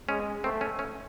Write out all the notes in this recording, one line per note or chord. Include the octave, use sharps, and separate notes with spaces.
G#3 C#4
A3 C4
C#4
C#4